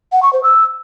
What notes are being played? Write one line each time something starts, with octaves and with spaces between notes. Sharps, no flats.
F#5
C#6
C5
E6